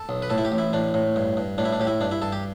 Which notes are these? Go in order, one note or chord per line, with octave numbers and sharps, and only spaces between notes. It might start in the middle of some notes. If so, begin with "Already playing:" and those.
Already playing: A4
B1
B4
A2 A4
E4
G4
A1
E4
A2 D4
A2
G2
G2
A2 D4
E4
D4
A2 G4
E4
G2 D4
E4
G2 A4
G4